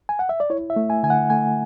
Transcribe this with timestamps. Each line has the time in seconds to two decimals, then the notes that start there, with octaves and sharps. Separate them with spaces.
0.09 G#5
0.19 F#5
0.29 E5
0.40 D5
0.50 E4 C#5
0.70 E5
0.76 A3
0.90 G#5
1.03 D3 G#5
1.10 F#5
1.30 A3 G#5